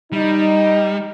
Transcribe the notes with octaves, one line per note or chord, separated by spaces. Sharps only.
G3 D#4